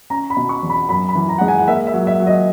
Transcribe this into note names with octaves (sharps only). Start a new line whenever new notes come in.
C#4 A#5
B5
B2
C#6
E2
B5
F#2 B5
B5
E3
A#5
G#3 F#5
G#5
F#5
A#3 E5
E5
F#3
E5
F#3
D#5